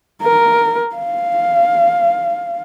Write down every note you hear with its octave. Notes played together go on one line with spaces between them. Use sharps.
A#4
F5